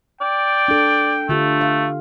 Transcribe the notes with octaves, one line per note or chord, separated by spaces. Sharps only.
D5 G5
D4 A4
D3 A3 F4 G4
F5